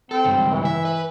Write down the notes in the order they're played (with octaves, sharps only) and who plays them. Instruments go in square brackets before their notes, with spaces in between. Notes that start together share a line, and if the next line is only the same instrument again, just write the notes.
[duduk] C4 [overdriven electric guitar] A4
[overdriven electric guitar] C#2 G2
[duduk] E3
[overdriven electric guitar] E5
B4